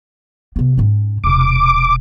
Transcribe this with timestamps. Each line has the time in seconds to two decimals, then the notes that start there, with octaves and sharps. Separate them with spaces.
0.56 C3 B3
0.78 G#2 C#4
1.24 E1 C3 D6